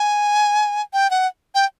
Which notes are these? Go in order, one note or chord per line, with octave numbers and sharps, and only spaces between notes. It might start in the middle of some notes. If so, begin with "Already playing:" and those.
Already playing: G#5
G5
F#5
G5